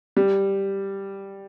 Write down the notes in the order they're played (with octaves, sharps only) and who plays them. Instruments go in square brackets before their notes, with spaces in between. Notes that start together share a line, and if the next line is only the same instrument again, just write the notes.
[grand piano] G3